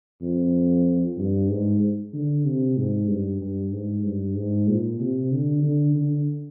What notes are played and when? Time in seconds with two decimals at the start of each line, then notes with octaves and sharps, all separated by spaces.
0.22 F2
1.18 G2
1.50 G#2
2.13 D3
2.45 C3
2.77 G#2
3.09 G2
3.41 G2
3.72 G#2
4.04 G2
4.36 G#2
4.68 A#2
5.00 C3
5.32 D3
5.64 D3
5.95 D3